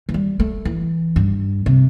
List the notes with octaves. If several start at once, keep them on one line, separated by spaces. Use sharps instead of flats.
E3
G3
A3
E3
G2
C3